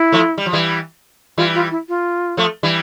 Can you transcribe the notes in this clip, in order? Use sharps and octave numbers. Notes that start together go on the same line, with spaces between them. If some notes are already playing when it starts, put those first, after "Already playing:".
Already playing: E4
F3 A3
G3
F3
E3 G3
E3 G3 F4
F4
E4
F4
F3 A3
E3 G3